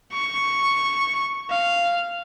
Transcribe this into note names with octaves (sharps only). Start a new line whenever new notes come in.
C#6
F5